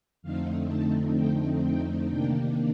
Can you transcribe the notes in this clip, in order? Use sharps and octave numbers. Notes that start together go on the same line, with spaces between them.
F2 D3 A3 C4 D#4 F5
A5
G5
G5
C3 D#3 A#3 D4 G5